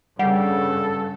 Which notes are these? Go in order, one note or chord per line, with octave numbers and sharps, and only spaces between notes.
G2 C#3 G3 A4 F#5